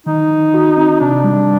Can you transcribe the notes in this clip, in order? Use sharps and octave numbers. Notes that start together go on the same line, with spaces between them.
D#3 D#4
D#3
F#4
C4
C3 D4
G3